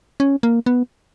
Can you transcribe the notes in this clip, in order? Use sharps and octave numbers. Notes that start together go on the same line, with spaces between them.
C#4
A#3
B3